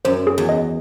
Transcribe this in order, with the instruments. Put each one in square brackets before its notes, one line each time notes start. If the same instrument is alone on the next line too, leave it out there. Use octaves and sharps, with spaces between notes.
[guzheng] F#2 [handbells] C5
[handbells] G#4
[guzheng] E2
[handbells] D#5